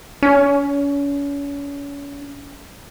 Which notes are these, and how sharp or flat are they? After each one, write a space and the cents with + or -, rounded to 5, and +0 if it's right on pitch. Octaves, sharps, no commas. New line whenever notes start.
C#4 +35